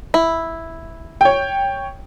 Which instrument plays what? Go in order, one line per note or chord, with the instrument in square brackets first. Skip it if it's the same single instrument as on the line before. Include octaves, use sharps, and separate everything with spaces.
[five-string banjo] E4
[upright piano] C#5 G5